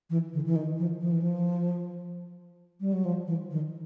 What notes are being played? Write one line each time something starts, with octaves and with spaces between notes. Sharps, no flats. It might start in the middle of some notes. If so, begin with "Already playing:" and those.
E3
D3
E3
D#3
F3
F3
E3
F3
G3
F#3
F3
E3
D#3